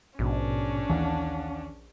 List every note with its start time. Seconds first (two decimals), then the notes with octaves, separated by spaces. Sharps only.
0.19 A#1 G#2 B2 C#4 D4
0.89 D#2 E3 F5 F#5 A5